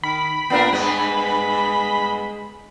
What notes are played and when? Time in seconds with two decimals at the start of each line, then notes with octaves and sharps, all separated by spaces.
0.04 D#3 B5
0.50 A#2 B3 D4 A#4
0.73 G2 G#3 B3